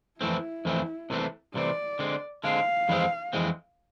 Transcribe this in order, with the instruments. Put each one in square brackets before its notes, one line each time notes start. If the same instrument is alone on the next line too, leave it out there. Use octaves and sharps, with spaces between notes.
[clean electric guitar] F2 E3 A3 C4 [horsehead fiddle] E4
[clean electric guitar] F2 E3 A3 C4
C2 C3 E3 A3 C4
[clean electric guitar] C2 C3 E3 A3 C4 [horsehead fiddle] D5
[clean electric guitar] D3 G#3 C4
[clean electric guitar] D3 G#3 C4 [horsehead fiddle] F5
[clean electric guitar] F2 E3 G#3 C4
F2 E3 G#3 C4